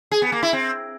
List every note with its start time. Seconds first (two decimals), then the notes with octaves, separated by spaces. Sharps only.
0.12 G#4
0.22 B3
0.32 A#3
0.43 E4
0.53 C4